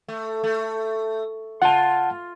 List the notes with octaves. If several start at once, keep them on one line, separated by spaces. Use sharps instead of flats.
A3
A3
F4 F#5 A5